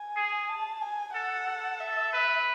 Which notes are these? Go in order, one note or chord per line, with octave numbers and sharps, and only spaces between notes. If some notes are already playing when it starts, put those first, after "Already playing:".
Already playing: G#5
G#4
A5
G#5
A4 F#5
A4
E5
B4